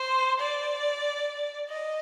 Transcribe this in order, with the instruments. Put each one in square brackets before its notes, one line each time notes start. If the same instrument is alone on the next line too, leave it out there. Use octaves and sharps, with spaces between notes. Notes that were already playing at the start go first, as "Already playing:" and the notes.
Already playing: [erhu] C5
D5
D#5